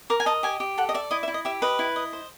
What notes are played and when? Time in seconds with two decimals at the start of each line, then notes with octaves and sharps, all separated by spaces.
0.10 A#4 D6
0.20 G#5
0.26 D#5 A5
0.43 G4 G#5
0.60 G4
0.78 A4 F#5
0.89 D#5
0.94 D5 E5
1.11 E4 D#5
1.23 E5
1.28 E4
1.34 D#5
1.45 G4 E5
1.62 B4 D#5
1.79 E4
1.96 D#5
2.13 C5